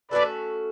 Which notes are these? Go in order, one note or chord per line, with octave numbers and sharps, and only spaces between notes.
A3 C#4 F#4 A4 B4 D5